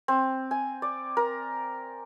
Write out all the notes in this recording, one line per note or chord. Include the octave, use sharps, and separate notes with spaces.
C4
G#5
D5
A#4